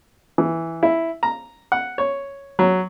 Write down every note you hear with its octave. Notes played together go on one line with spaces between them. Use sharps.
E3
E4
A#5
F#5
C#5
F#3